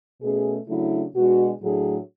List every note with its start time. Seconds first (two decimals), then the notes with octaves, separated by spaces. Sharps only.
0.22 B2 A3 C#4 G#4
0.68 C#3 F#3 A3 D4 E4
1.15 B2 G#3 D4 F#4
1.62 A2 F#3 A3 D4 G#4